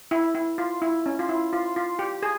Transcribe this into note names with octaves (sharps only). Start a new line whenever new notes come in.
E4
E4
F4
E4
C#4
F4
E4
F4
F4
G4
G#4